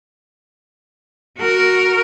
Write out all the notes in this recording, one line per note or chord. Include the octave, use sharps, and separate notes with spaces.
F#4 A#4